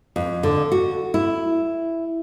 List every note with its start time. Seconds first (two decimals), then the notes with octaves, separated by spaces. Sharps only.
0.16 F2
0.43 D3
0.72 F#4
1.14 E4